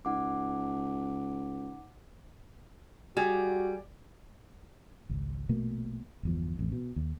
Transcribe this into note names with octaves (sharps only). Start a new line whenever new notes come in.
C#2 D#4 F#5 D6
G3 F#4 G#4
G#1 C#2
A#1 B2 A3 A#3
G1 E2 F3
A1 F2
B2
D#2